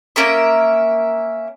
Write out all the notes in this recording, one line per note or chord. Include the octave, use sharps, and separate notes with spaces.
A#3 C#4 A#4 E5